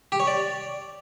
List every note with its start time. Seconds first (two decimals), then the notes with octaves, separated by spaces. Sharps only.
0.12 G4
0.20 C#5
0.27 D5